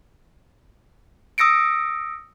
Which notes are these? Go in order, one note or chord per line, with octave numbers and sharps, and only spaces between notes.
D#6 E6 A#6 C#7 D7